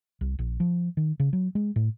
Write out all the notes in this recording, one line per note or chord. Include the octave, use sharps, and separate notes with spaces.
C2
A#1
F3
D#3
C#3
F#3
G#3
A2